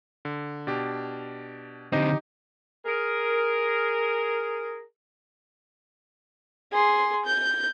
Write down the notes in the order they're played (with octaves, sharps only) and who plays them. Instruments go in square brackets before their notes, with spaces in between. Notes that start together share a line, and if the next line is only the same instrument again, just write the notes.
[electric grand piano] D3
B2 D4 G4
[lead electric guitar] D3 C4 [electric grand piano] D#4 G4 D#5
[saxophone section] G#4 A#4
[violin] G#4 C6
G6